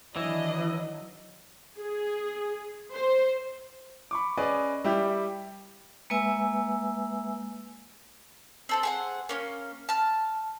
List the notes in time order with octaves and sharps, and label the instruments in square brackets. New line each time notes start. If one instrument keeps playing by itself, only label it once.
[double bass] D#3 F#3 [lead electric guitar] E3 [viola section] D4 E4 D#5
[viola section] G#4
C5
[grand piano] B5 C#6 D6
C#4 G#4 B4 D5 D#5
G3 E4 G4
[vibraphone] G#3 A#3 B4 E5 G#5 E6
[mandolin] C4 A4 C5
G#4 C5 F#5
A#3 C#4 C#5
A5 F6